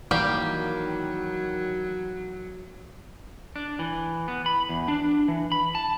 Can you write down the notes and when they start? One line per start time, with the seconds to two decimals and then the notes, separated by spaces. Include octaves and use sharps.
0.11 D#3 E3 F#3 G3 A#3 G4
3.56 D4
3.79 E3
4.28 B3
4.46 B5
4.69 E2
4.88 D4
5.28 E3
5.52 B5
5.75 A5